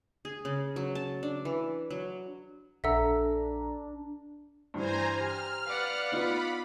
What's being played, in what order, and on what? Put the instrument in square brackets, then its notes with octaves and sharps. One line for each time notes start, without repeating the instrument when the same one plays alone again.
[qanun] G#4
C#3
F#3
A5
D4
E3
F#3
[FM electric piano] A#1 A4 A#5 [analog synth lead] D4 [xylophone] E5 F#5 E6
[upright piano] G2 E3 [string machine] C5 G#5 A#5
[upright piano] G4 [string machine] F6
[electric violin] B4 F#5 [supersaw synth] D5 F5
[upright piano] B3 D#4 F4 [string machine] B5